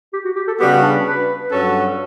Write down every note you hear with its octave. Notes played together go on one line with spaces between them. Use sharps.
G4
F#4
G4
A4
C#3 G3 B3 F#4 G4
D4
B4
G2 F#3 C#4 F#4 A4